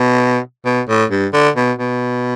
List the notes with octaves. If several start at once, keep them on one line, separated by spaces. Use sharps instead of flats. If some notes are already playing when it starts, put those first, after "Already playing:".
Already playing: B2
B2
A2
G2
D3
B2
B2